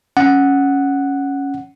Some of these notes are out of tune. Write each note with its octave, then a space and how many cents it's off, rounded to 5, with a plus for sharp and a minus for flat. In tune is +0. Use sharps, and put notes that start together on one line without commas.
C#4 +0 F#5 +0